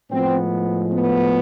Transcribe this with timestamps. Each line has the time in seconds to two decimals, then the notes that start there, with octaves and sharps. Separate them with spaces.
0.11 A2 F3 G#3 B3 C4
0.93 B3